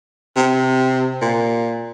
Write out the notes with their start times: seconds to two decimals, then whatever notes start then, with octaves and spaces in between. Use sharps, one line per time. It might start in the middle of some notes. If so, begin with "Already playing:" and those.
0.37 C3
1.22 A#2